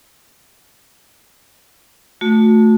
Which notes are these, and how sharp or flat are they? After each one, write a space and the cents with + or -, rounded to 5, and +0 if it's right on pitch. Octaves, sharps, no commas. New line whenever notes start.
A3 +0 F#4 -35